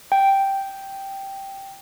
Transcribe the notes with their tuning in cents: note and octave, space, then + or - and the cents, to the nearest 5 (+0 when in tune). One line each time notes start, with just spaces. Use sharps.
G5 -5